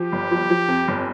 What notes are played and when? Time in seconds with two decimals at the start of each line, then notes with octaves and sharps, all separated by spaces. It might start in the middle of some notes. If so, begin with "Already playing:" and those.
Already playing: F3 G4
0.12 G1
0.31 F3
0.50 F3
0.68 F2
0.88 G1